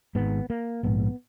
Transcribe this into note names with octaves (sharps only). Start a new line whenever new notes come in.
G#1 G#2 B3
A#3
A#1 G#2 B3